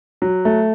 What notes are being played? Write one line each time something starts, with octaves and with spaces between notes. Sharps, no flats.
F#3
A3